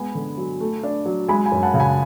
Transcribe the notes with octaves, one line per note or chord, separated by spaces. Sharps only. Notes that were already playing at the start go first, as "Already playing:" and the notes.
Already playing: G#3 B3 G#5 B5
D3
F#3
A3
D4
F#3
G#3 G#5 B5
G#5 B5
F#2
F#5 A5
C#3
G#5 B5